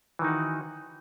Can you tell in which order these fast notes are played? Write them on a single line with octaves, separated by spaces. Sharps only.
E3 D#3 D#4 F#4